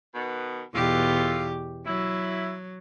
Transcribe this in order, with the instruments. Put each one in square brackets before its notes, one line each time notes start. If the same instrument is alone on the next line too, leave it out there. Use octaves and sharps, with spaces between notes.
[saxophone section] B2 D#3 B3
[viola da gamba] E2 B2 G4 [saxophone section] F4 A4
[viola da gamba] F#3 [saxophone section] E4